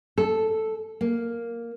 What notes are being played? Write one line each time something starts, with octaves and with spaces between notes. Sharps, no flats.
A4
A#3